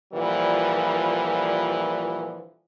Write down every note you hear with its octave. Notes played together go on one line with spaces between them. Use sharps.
A#2 D3 E3 F3 G3